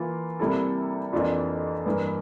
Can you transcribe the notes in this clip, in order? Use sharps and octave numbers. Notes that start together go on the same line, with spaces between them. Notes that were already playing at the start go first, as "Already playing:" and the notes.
Already playing: E3 A#3 F4
C3 G3 A#3 E4 A4
F2 E3 A#3 D4 F4
G2 E3 A#3